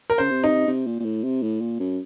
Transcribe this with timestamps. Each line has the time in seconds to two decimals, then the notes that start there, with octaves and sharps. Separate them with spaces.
0.10 A#4
0.18 C#3 C5
0.31 C3
0.44 D#4
0.68 C3
0.87 A#2
1.00 A#2
1.05 A2
1.24 C3
1.43 A2
1.61 A#2
1.80 F#2